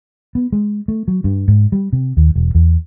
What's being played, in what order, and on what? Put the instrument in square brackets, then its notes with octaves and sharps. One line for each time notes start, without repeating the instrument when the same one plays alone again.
[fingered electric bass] B3
G#3
A3
F#3
G2
G#2
G3
C3
D#2
E1
E2